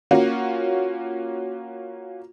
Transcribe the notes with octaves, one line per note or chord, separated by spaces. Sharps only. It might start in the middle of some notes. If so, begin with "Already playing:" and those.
A#3 C#4 F4 F#4